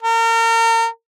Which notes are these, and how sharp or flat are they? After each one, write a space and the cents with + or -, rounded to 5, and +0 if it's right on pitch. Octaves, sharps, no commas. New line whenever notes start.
A#4 -35